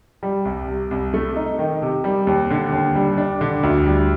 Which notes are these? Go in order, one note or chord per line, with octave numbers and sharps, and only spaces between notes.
G3
C2
C3
C2
A3
D#4
D#3
C3
G3
D#2
D3
D#2
G3
D4
D3
D2
G3